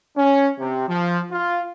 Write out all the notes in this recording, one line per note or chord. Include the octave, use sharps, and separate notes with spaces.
C#4
C3
F3
F4